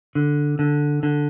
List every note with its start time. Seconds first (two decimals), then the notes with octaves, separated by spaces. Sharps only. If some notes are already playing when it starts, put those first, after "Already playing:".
0.15 D3
0.59 D3
1.03 D3